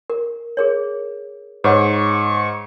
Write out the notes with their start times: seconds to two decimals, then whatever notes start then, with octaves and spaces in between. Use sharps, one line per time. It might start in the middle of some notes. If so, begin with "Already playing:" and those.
0.10 A#4
0.57 G#4 A#4 C#5
1.64 G#2 B4 C#5 F#5 C#6